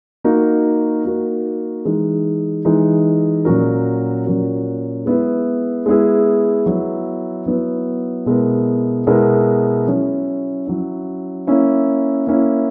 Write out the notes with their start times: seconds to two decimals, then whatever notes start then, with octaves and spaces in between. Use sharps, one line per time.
0.24 A#3 D#4 F#4 A#4
1.05 A#3 D#4 F#4 A#4
1.85 E3 G#3 D#4
2.65 E3 G#3 D#4
3.45 A#2 F#3 C#4 F#4 A#4
4.26 A#2 F#3 C#4 F#4 A#4
5.05 G#3 B3 E4 G#4
5.86 G#3 B3 E4 G#4
6.66 F#3 B3 E4
7.46 F#3 B3 E4
8.26 B2 G#3 B3 E4 A#4
9.07 B2 G#3 B3 E4 A#4
9.87 F#3 C#4 E4
10.67 F#3 C#4 E4
11.47 A#3 C#4 E4
12.27 A#3 C#4 E4